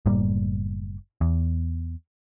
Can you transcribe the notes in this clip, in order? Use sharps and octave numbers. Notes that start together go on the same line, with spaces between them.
F#1 A2 G3 A#3
E2